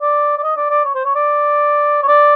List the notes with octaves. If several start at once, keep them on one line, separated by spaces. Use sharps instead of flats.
D5
D5
D#5
D5
D5
C#5
C5
C#5
D5
C#5
D5